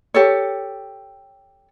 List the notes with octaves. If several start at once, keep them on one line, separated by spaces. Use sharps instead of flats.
G4 A4 C#5